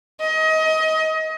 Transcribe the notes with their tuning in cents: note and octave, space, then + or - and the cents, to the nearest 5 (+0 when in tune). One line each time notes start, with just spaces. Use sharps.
D#5 +30